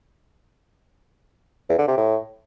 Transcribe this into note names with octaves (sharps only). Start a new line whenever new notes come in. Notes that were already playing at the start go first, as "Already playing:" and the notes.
E2
D3
C3
A2